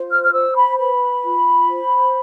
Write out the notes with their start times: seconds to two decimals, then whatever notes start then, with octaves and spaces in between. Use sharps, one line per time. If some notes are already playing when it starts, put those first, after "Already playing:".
Already playing: F4 C5
0.10 F6
0.24 F6
0.32 C5 E6
0.55 B5
0.78 B4 B5
1.24 F4
1.69 C5